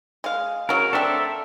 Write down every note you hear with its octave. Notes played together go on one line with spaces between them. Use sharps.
G#3 F5
C#3 F#3 A#4
C4 D4 A4 E5